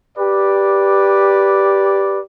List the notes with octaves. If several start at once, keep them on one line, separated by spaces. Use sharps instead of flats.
G4 B4 D5